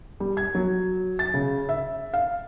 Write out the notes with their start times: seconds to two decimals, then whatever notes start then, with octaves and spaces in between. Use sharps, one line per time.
0.20 G3
0.37 G#6
0.55 F#3
1.19 A6
1.34 C#3
1.69 E5
2.14 F5